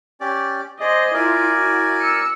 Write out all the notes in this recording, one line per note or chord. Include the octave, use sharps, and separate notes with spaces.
C#4 G4 D5
G#4 C5 D5 D#5
E4 F4 A#4 D5 G#5
E4 F#4
E6 C#7